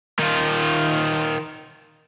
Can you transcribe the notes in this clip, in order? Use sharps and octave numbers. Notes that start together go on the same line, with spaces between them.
D#3 F4